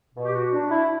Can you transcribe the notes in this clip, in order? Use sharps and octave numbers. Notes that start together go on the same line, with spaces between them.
B2
G4
F#4
D4
E4